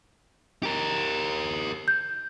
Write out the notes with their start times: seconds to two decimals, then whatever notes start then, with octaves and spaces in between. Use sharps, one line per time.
0.63 G4 A#4
1.88 G6